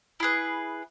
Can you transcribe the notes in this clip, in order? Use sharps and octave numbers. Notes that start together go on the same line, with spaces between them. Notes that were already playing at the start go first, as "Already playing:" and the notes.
E4 G#4 B4